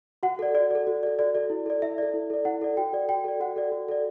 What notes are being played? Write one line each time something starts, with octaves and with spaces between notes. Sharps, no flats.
F#4 F#5
A4 D5
F#4 D5
A4 D5
F#4
A4 D5
F#4 D5
A4 D5
E4
A4 D5
E4 E5
A4 D5
E4
A4 D5
E4 F#5
A4 D5
F#4 G5
A4 D5
F#4 G5
A4 D5
F#4 F#5
A4 D5
F#4
A4 D5